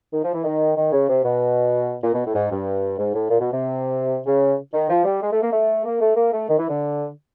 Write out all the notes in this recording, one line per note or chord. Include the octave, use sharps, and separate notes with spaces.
D#3
F3
E3
D#3
D#3
C#3
C3
B2
A#2
B2
A2
G#2
G2
G#2
A2
A#2
B2
C3
C#3
D#3
F3
G3
G#3
A3
A#3
A3
A#3
A3
A#3
A3
D#3
E3
D3